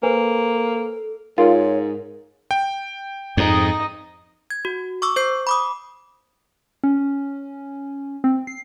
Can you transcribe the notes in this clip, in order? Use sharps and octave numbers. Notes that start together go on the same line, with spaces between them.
A#3 A4 B4 C5 G#5
G#2 F4 A#4 C#5
G5
F2 G#2 D#4 D#5
G#6
F#4
C#6 D6 E6
C5 G6 C7
B5 D6 D#6
C#4
C4
C7